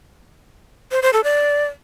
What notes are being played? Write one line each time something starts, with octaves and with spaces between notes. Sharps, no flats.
C5
C5
A4
D5